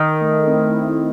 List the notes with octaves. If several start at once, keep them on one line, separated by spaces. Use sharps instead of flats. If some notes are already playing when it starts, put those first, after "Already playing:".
Already playing: D#3
A3
C4 E4